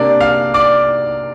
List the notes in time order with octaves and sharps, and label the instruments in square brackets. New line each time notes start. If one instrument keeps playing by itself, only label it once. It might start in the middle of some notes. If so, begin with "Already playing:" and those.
Already playing: [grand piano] C3 A#3 D4 D5
F5 F6
D5 D6